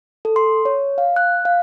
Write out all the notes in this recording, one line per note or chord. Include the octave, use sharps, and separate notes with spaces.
A4
C6
C#5
F5
F#6
F5